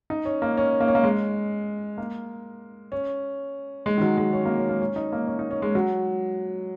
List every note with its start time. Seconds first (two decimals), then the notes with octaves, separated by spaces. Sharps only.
0.10 D#4
0.25 C#4
0.42 A#3
0.57 C#4
0.80 A#3
0.88 C#4
0.95 A#3
1.03 G#3
1.98 A#3
2.92 C#4
3.86 G#3
3.98 D#3
4.02 F#3
4.18 G#3
4.33 C#4
4.45 A#3
4.56 C#4
4.69 A#3
4.80 C#4
4.96 D#4
5.12 A#3
5.27 C#4
5.39 D#4
5.51 C#4
5.62 G#3
5.75 F#3